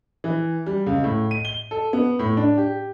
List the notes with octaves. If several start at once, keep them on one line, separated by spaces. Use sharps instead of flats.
E3
G3
C#2
A2
D#7
G7
A4
B3
A2
D4
G4